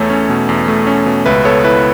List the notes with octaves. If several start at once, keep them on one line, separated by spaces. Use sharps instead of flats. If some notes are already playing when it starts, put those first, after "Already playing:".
Already playing: E2 A3 A4 C#5
C#4
B2
E2
A3
C#4
B2
C#2 B4 E5
B3 A4 C#5
E4 B4